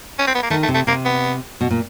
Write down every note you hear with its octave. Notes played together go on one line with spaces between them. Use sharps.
C#4
C4
B3
A#3
D#3 A3
A3
C3
A3
C3 A#3
B3
B2
A#2